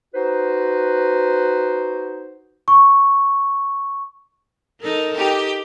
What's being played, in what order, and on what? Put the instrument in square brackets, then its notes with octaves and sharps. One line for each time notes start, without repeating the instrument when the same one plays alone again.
[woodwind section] D#4 F#4 B4 C5
[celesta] C#6
[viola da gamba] D#4 A4 A#4
[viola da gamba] D#4 [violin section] G4